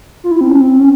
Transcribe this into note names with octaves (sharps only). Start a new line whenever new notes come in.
F4
E4
C4
C#4
C4
C#4